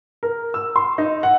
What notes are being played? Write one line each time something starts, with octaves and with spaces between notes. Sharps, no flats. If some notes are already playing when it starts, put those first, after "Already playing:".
A#4
E6
C6
D#4
F#5